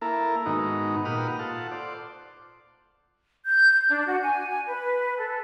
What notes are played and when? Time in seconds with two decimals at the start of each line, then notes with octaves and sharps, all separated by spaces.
0.02 A#3 E4 A4 A#4
0.46 G#2 D#3 B3 D#4 F#4
1.05 A#2 G4 B4 F#5 D#6 F6
1.39 F4 A4 F#5
1.71 C5 D5
3.45 G6
3.88 D4
4.06 F#4
4.22 G#5
4.49 G#5
4.67 B4
5.17 A4